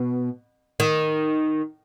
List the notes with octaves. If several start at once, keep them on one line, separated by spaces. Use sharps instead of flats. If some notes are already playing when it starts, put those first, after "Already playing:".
Already playing: B2
D#3